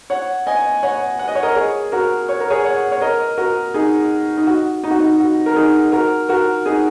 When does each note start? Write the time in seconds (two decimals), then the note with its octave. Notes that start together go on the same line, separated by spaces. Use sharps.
0.10 C#5 F#5
0.47 D#5 G#5
0.83 C#5 F#5
1.19 F#5
1.28 D#5
1.35 C#5
1.43 A#4 D#5
1.56 G#4 C#5
1.92 F#4 A#4
2.29 C#5
2.40 A#4
2.50 G#4 C#5
2.65 C#5 F#5
2.92 C#5
3.01 A#4 D#5
3.38 F#4 A#4
3.74 D#4 G#4
4.37 D#4
4.47 F#4
4.84 D#4
4.91 F#4
4.99 D#4
5.20 F#4
5.46 A#4
5.56 D#4 G#4
5.92 F#4 A#4
6.29 F#4 A#4
6.66 D#4 G#4